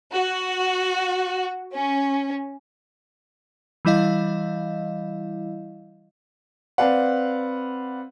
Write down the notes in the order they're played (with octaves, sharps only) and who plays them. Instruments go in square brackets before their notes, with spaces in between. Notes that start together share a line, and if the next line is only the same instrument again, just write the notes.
[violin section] F#4
C#4
[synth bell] E3 G3 E4 D#5 F5
[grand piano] C4 B4 D5 F5 F#5